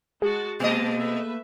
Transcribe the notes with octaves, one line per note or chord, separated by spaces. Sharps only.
G#3 F#4 G#4 A5
B2 G#3 A#3 D#5 A5
A3 B4 E5